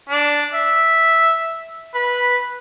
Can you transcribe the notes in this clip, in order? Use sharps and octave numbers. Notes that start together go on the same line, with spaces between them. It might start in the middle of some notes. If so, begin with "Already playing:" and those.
D4
E5
B4